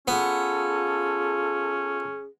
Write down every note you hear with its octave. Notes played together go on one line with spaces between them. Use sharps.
B3 C#4 F4 G#4 A4